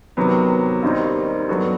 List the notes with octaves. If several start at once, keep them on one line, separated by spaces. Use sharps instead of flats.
C3 D#3 F#3 B3
D#2 D#3 G3 C4 D#4
G2 F#3 B3 F#4 A4